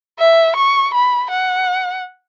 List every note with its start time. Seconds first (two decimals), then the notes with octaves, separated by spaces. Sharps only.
0.19 E5
0.56 C#6
0.94 B5
1.30 F#5